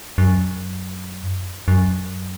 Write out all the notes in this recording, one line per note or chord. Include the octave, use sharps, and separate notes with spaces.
F#2
F#2